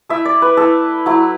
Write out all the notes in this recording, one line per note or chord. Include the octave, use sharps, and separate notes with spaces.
A3 E4 E5
D5
B4
A3 E4 A4
F#3 A3 E4